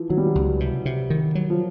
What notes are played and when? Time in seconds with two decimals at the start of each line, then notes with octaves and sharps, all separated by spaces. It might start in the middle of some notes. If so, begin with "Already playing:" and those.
Already playing: E3 F3
0.09 D#3 F#3
0.17 G3
0.27 F#3
0.35 C#2
0.60 C3
0.86 C3
1.10 D#3
1.35 F#3
1.50 F3